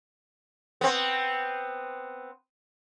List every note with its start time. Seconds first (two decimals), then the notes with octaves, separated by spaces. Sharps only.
0.81 B3 C4